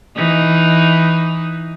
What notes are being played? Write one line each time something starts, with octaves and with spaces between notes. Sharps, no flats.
E3 D#4